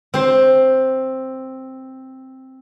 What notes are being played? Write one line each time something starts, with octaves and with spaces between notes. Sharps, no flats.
C4 C5